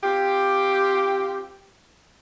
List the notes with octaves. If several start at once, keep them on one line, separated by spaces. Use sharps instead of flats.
C4 F4 G4